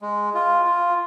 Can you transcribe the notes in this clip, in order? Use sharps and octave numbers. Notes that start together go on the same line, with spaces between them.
G#3
F4
F4